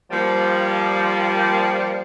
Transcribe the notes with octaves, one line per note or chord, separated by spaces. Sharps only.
F3 G3 A#3